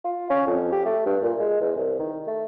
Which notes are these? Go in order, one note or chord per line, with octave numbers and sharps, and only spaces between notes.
F4
C#4
F2
G4
A3
G2
A#2
G#3
E2
C2
D#3
A3